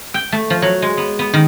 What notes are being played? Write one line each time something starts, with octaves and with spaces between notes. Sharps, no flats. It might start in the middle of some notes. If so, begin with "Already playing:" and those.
G5
A3
F3
F#3
G#3
B3
B3
D#3